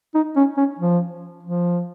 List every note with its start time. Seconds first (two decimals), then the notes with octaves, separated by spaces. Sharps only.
0.15 D#4
0.36 C#4
0.57 C#4
0.79 F3
1.43 F3